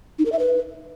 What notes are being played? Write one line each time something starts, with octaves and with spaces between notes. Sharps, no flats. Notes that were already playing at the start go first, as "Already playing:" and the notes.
D#4
A#4
E5
B4